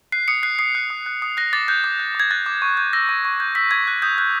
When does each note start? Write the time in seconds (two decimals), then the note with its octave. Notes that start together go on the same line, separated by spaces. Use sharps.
0.12 F#6 C7
0.28 D#6 C#7
0.43 F#6 C7
0.59 D#6 C7
0.75 F#6
0.90 D#6
1.06 F#6
1.22 D#6
1.37 F#6 A#6
1.53 D6 A6
1.68 F#6 G6
1.84 D6
2.00 F#6
2.15 D6 G#6
2.31 F#6 A6
2.46 D6
2.62 C#6
2.77 G6
2.93 E6 A#6
3.09 C#6
3.25 C#6
3.40 G6
3.55 E6 B6
3.71 C#6 G#6
3.87 F#6
4.02 D#6 G6
4.18 F#6 G6